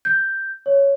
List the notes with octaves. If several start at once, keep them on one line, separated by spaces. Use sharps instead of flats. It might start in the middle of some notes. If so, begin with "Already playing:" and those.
G6
C#5